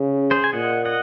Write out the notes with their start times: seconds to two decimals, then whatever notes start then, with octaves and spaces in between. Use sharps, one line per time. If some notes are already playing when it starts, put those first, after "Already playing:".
Already playing: C#3
0.31 G#4 C5
0.44 G#5
0.53 A#2 D#5 F#5
0.85 D#5 F#5